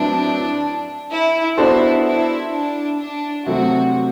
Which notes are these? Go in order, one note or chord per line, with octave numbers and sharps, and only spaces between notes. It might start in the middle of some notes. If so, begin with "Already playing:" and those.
Already playing: A2 F#3 C4 D4 E4 B4
E4
B3 D4 E4 F#4 A4 C5
E4
D4
D4
C3 F#3 A3 C4 F#4